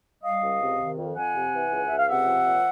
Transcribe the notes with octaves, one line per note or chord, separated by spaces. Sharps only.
G3 D#5 F5
C#2
C3
D#3
F2
F2 F#5 G#5
C3
E3
C#2
C#2 E5
F5
C3 E5 F#5
F3
A#2